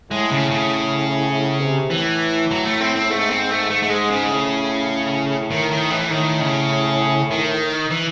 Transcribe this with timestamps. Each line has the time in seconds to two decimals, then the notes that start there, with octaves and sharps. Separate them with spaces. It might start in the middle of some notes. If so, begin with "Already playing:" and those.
0.11 A2 G#3
0.31 C#3
0.51 C#3
1.31 A2
1.61 C3
1.91 A2 E3
2.51 F#3
2.65 A3
2.80 C4
2.95 C4
3.10 G#2 A3
3.30 C4
3.51 A3
3.70 A3
3.82 A3
3.90 G#3
4.10 C#3
4.30 A2
5.50 D#3
5.70 D#3
5.90 E3
6.10 A2 D#3
6.40 C#3
7.31 D#3
7.90 E3